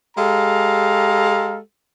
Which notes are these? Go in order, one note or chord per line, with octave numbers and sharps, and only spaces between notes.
G#3 G4 A4 F5 A#5